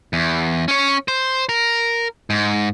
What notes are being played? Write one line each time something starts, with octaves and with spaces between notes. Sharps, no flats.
E2
C#4 C#5
C5
A#4
G#2